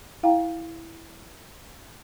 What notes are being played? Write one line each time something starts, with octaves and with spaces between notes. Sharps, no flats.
E4 F5 G5 A#5